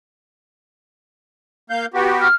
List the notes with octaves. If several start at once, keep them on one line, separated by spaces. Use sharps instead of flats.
A#3 F5 G6
B3 F#4 G4
F6